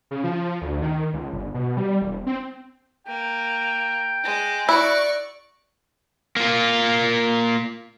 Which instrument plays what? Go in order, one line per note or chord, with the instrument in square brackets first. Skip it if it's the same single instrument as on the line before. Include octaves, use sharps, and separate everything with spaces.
[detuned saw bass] C#3
F3
D2
D#3
C#2
G1
B2
G3
E1
C4
[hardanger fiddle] A#3 [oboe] G5
[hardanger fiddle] G#3
[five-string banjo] E4 [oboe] F#4 [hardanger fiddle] D5 C#6
[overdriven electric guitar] A#3 F4